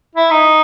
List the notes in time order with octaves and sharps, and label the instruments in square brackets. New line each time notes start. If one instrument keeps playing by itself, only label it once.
[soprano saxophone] E4
D#4